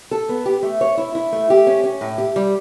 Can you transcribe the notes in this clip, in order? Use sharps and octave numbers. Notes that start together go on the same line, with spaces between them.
A4
B3
G4
A3
C#5
E4
E4
A3
G4
C#4
C#4
A2
G4
G3